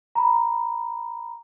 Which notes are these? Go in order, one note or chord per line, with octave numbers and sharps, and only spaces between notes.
A#5 B5